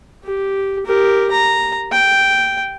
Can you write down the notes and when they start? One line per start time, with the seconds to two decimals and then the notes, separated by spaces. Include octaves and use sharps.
0.24 G4
0.86 G4 A#4
1.31 A#5
1.92 G5